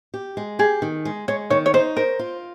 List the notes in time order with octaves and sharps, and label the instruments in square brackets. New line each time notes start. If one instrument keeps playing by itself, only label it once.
[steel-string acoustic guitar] G4
G#3
[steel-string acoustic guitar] G4 [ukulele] G#4
[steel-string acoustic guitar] D#3
G#3
[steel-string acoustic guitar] G#3 [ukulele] C#5
[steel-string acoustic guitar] D#3 [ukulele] C#5
[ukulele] C#5
[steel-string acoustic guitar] D#4 [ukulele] C5
[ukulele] A#4 [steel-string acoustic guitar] C5
[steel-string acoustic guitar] F4